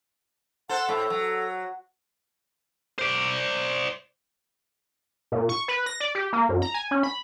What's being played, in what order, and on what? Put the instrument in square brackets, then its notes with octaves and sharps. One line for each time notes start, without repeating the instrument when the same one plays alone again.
[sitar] A4 C5 [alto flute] F#5
[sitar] A2 [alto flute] A4
[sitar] F#3
[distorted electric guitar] C5 D5
[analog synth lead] A#2
C#6
B4
A#6
D5
G4
A#3
F#2
A#5
G#5
C#4
B5